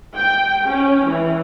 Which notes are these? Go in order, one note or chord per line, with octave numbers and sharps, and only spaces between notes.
G5
C#4
E3